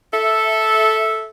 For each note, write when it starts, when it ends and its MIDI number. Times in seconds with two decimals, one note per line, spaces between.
0.13 1.27 69
0.13 1.27 76